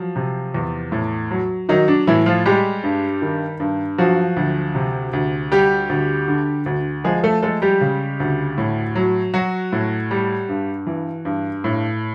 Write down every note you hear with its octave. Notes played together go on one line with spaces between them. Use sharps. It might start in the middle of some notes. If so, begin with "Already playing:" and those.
Already playing: F3 F#3
C3
E2
A2
F#3
D#3 F#3 D#4
D4
A2 E3 E4
F3 F4
G3 G#3 G4
G2
D#3
G2
F3 F#3 F#4
D2
C3
D2
G3 G4
D2
D3
D2
F3 G#3 G#4
A3 A4
G#3 A3 A4
G3 G4
C#3
D2
A2
F#3
F#3 F#4
A2
G3
G2
E3
G2
A2